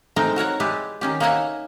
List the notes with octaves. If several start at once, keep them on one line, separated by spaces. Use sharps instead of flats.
G#3 A3 C4 D#4 A#4 G5
F#4 A#4 C#5 F#5
G#3 E4 G4 B4 D5
D#3 C#4 G4
A#3 D#4 C#5 E5 F#5 G#5